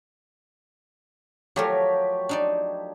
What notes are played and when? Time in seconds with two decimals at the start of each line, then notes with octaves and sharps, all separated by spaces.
1.56 F3 F#3 A3 G4 A#4 C#5
2.29 D4 D#4 D5